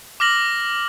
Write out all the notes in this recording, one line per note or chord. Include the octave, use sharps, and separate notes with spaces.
D6 F6 A#6 F#7